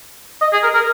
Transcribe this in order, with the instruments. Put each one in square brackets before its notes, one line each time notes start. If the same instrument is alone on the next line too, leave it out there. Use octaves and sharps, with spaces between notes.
[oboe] D#5
G#4
A#4
A#4